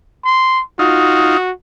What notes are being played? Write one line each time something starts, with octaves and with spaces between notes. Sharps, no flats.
C6
D#4 F4 F#4